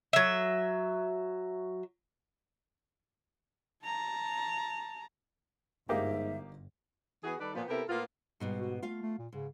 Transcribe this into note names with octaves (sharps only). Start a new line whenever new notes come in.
F#3 E5
A5 A#5
G1 G#2 A#3 D#4 G4 E5
E3 B3 F#4 G#4
D#3 G3 A4 B4 D5
A#2 F3 B3
C3 B3 E4 G4 A4 A#4
A2 A#3 B3 F4
G#2 B2 G3
F#4
A3 F4 F5
A3
A#2
G#2 C#3